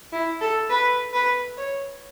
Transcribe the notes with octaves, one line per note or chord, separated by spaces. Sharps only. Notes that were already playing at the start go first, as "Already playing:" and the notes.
E4
A4
B4
B4
C#5